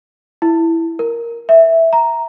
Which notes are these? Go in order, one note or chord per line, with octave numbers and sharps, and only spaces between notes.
E4
A#4
E5
A#5